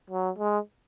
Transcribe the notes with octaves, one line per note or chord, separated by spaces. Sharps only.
F#3
G#3